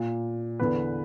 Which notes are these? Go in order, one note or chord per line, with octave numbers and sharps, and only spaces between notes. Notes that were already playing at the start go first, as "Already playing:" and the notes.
Already playing: A#2
E2 D3 B4